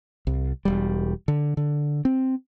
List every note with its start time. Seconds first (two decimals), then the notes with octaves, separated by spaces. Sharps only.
0.27 C2
0.65 E1 G3
1.28 D3
1.57 D3
2.05 C4